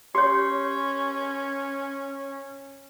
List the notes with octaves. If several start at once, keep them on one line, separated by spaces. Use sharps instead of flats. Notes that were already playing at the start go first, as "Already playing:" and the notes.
C#4 G4 C#5 C6